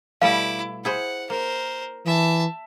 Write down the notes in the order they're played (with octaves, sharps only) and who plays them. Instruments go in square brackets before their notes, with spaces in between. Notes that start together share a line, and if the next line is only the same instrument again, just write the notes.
[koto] B2 G3 A3 [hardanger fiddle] E4 D6 [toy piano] F5
[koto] E4 G#4 C5 [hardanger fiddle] F#5
[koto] A#3 [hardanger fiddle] A#4 C5
[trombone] E3 [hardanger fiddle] E5 A5